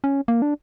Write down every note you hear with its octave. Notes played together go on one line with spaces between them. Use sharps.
C#4
A#3
D4